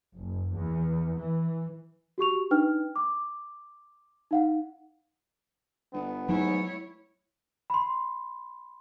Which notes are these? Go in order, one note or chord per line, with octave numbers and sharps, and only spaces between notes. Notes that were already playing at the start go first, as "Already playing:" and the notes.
F#1
E2
E3
F#4 G4 C#6 F7
D4 D#4 B4 G5 F6
D6
D#4 F5 F#5
G1 B3
G#2 F#3 G#3 A3 E4 C#5
B5 C6